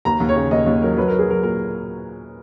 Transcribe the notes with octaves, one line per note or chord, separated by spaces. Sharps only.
D#2 A#5
D#2
C#5
C#3
D#2 D#5
D#2
F#3 A#4
F#3 B4
F#3 A#4
G#4
F#3 A#4
A#2 A#4